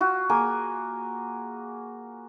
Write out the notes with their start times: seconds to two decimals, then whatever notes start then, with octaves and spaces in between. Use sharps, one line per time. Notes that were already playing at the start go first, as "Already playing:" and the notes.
0.01 F4 F#4
0.29 A#3 G#4 A#4 G#5